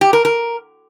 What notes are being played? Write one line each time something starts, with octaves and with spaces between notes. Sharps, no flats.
G4
A#4
A#4